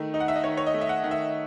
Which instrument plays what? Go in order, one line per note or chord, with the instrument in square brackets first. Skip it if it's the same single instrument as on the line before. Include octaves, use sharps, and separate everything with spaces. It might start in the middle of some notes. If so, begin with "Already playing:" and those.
Already playing: [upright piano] D#3 A3
D#4
F#5
E5
D#5
D#3 C#5
C#5
D#5
A3
E5
F#5
D#3
E5